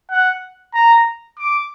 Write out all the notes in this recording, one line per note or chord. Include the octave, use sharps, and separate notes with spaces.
F#5
A#5
D6